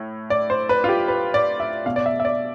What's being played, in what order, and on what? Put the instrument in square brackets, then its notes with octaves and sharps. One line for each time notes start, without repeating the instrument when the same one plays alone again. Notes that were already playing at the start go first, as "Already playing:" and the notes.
Already playing: [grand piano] A2
D5
C5
B4
F4
G4
B4
D5
E5
B2 F5
D5
E5
E5
D5